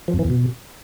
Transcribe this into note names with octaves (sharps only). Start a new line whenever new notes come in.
F3
F2
E3
E2
B2